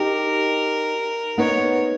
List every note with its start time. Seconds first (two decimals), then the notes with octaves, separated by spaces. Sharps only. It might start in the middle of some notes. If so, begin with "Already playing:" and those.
Already playing: D#4 G4 A#4
1.38 B3 D#4 C#5